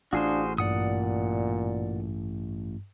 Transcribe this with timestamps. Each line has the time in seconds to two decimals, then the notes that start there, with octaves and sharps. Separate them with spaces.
0.13 A1 D4 F4 F#4 G#4 C5 F5 D#6
0.58 G2 A#2 D5 F#5 D#6